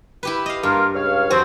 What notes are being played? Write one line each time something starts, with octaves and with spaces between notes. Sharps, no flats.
E4 G4 B4
D#5 F5
G2 A#3 F4 A#4
C#2 C#5 F5
F2 C4 F#4